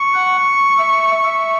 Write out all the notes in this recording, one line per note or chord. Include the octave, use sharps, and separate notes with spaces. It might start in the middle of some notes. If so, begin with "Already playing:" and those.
Already playing: C#6
F#5
E5
E5